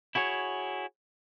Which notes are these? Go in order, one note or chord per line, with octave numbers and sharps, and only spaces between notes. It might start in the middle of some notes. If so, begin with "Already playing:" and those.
E4 F#4 G#4 C#5